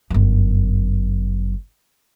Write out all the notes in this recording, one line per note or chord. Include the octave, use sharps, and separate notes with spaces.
G1 F#2